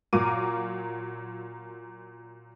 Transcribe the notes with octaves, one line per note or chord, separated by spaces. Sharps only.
A#2 F#3 A#4 F5 D6 D#7